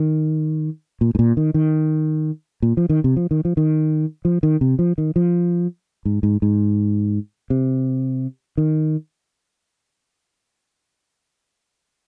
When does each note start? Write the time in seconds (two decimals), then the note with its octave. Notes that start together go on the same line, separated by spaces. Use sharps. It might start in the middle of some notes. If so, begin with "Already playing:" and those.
Already playing: D#3
1.01 A#2
1.15 G#2
1.19 A#2
1.37 D#3
1.54 D#3
2.62 A#2
2.77 F3
2.89 D#3
3.04 C3
3.17 F3
3.31 D#3
3.45 F3
3.57 D#3
4.25 F3
4.43 D#3
4.61 C3
4.79 F3
4.98 D#3
5.16 F3
6.05 G#2
6.23 G#2
6.42 G#2
7.50 C3
8.57 D#3